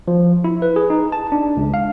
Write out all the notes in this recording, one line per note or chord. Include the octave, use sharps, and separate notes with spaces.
F3
E4
B4
G#4
D#4
A5
D4
C#2
F5